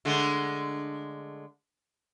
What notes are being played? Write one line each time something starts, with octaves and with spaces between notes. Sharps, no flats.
D3 G#3 A3